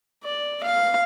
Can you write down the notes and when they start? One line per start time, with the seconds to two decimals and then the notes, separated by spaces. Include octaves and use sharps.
0.24 D5
0.64 F5